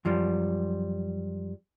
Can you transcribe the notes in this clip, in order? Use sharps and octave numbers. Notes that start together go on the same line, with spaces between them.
F#2 F3 G3